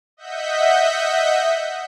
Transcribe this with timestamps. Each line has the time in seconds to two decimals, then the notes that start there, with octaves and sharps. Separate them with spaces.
0.17 D#5 E5 F#5 G6 B6